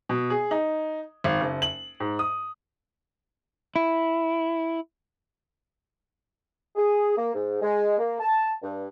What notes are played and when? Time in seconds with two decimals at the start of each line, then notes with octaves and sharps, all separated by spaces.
0.09 B2
0.30 G#4
0.51 D#4
1.24 G#1
1.41 F#1
1.62 F#7
2.00 G#2
2.19 D#6
3.76 E4
6.76 G#4
7.17 A#3
7.34 G#2
7.62 G#3
7.98 A#3
8.20 A5
8.63 G2